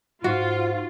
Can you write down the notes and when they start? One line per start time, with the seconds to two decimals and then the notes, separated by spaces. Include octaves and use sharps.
0.24 G#2 F4 F#4